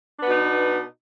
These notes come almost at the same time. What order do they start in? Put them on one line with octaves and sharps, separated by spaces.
D4 B3 B2 D#4